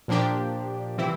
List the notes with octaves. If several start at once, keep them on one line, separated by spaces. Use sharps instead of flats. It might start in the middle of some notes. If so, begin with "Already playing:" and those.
A#2 F3 A#3 D4 G4
C3 E3 G3 C4 E4